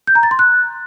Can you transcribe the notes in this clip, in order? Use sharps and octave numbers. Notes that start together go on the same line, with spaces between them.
G6
A#5
A6
C6
F#6